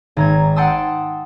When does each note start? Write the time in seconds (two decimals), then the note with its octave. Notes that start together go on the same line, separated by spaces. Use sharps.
0.17 G#1 A#5 G#6
0.56 F#5 G5 A5 C6 D#6 E6